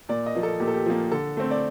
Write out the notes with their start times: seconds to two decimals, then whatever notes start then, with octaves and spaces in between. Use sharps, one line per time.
0.09 A#2 D5
0.26 D#5
0.35 F3 A#3
0.43 A4
0.60 A#2 G4
0.68 A4
0.74 G4
0.86 F3 A#3
1.12 D3 A4
1.37 A3 C4
1.51 D5